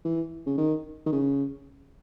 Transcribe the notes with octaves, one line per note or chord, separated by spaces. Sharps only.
E3
C#3
D#3
D#3
C#3